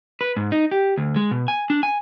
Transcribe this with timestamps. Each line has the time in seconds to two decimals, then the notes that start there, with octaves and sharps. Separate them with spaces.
0.21 B4
0.36 G#2
0.52 D#4
0.71 G4
0.97 D2
1.16 G#3
1.31 B2
1.48 G#5
1.70 D4
1.83 G#5